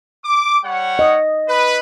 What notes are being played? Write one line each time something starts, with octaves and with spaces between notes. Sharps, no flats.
D6
G3 C#5 F#5
D#5
B4